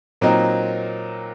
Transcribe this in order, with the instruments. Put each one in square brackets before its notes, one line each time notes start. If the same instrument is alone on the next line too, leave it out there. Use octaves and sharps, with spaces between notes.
[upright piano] A#2 F#3 C4 D#4 A#4